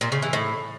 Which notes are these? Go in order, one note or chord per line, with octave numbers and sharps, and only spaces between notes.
A#2
C#3
E3
A2